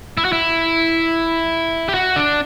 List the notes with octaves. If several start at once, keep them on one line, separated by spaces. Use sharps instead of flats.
E4
F#4
E4
G4
F#4
D4